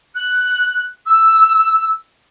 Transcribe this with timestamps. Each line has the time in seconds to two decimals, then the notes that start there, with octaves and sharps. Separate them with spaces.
0.14 F#6
1.05 E6